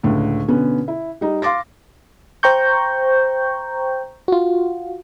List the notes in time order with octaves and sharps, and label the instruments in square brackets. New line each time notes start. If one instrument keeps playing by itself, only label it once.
[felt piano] C#2 A2 D3
B2 D3 B3 C#4
E4
G3 D#4
F5 C6 D6 A6 A#6
[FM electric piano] C5 G5 A#5 C#6 G6
F4 F#4